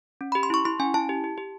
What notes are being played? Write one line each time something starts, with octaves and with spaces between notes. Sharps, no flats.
C#4
G4 B5
C6
E4 C#6
E4 C6
C#4 G#5
E4 A5
G4
G4
G4